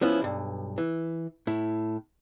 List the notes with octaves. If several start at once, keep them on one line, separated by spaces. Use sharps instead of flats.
F3 B3 C#4 E4
B1 G2
E3
A2 E4